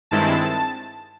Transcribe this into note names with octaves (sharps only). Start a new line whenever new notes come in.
G2 D#3 G#3 C4 E4 A5